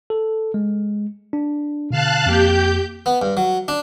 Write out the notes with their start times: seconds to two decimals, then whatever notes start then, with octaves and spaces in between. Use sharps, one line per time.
0.10 A4
0.54 G#3
1.33 D4
1.90 B2 D3 F5 A5 F#6
2.26 F2 A#3 G4 G6
3.06 B3
3.22 G2
3.37 F#3
3.68 D4